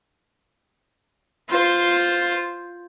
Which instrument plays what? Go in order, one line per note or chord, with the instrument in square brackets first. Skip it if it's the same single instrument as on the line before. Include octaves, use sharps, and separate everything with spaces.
[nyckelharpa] F4 C5